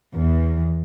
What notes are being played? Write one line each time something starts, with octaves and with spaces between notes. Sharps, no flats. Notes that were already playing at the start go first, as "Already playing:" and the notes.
E2